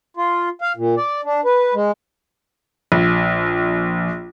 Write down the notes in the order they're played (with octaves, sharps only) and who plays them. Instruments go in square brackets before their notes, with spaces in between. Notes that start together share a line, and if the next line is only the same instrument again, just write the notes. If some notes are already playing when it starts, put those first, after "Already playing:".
[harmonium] F4
F5
A#2
D5
D4
B4
G#3
[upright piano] A#1